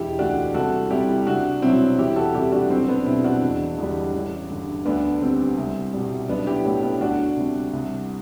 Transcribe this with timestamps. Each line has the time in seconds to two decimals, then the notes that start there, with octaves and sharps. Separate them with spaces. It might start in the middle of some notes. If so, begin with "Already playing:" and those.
Already playing: E1 E4 G4
0.19 D2 D3 D4 F#4
0.54 C2 F#4 A4
0.91 C3 G3 E4 G4
1.27 C2 D4 F#4
1.62 B2 F#3 C4 E4
1.98 E2 E4 G4
2.16 F#4 A4
2.34 C3 G3 E4 G4
2.52 D4 F#4
2.70 B1 C4
2.88 B3 D4
3.06 B2 G3 C4 E4
3.24 D4 F#4
3.42 E1
3.78 E2 D3 G3
4.14 A1
4.50 G2 D3
4.85 D2 B3 D4
5.21 D3 G3 C4
5.58 C2
5.94 B2 G3
6.29 B1 B3 D4
6.47 E4 G4
6.65 A2 F#3
6.83 B3 D4
7.00 D2 D4 F#4
7.36 C3 G3
7.73 C2